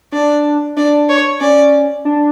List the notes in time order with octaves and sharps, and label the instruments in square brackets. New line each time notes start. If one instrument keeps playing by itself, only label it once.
[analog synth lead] D4 [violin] D5
[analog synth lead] D4 [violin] D5
[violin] C#5
[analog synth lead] C#4 [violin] D5
[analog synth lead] D4